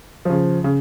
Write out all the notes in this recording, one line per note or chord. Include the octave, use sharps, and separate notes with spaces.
C#3 F3
C#3